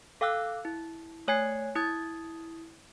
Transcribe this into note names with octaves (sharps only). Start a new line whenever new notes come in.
A4 F5 G5 D6 E6 F#6
E4
A3 C#5 G#5 G#6 C7
E4 D#6 G#6 A6